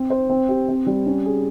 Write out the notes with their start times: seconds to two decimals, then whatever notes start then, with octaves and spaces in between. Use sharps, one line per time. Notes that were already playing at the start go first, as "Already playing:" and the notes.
Already playing: C4
0.10 C5
0.29 C4
0.49 G4
0.69 C4
0.86 G3
1.06 C#4
1.26 G#4